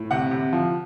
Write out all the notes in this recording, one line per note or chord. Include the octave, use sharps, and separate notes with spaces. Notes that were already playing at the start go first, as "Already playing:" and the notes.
Already playing: A2
C3 F#5
C3
F3